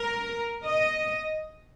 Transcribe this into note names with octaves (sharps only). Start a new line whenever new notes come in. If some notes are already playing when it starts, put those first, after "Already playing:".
Already playing: A#4
D#5